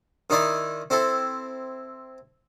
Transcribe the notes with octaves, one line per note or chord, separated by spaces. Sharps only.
D#3 D#4 E4 D5 C6
C4 E4 A4